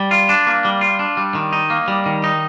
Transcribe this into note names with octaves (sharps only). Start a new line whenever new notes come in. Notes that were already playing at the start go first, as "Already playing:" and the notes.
Already playing: G3
F4
D4
A#3
G3
F4
D4
G3
D#3
D#4
A#3
G3
D#3
D#4